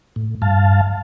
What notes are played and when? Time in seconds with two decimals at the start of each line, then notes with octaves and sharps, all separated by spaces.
0.16 A2
0.42 G2 F5 A5